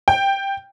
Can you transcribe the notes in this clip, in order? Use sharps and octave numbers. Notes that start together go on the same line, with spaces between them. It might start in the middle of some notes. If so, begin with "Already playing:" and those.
G5